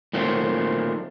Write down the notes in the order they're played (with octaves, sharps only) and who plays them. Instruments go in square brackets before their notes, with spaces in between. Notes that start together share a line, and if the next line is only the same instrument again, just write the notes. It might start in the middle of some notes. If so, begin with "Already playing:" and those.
[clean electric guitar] A#2 D#3 F#3 A3 C4